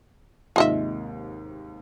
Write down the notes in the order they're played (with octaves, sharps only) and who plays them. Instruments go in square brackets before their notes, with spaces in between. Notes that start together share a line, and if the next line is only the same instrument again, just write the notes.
[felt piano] D#2 G#2 C3 [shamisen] F4 D#5 E5